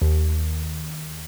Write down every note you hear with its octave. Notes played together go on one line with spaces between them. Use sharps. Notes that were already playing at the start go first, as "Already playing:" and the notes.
D#2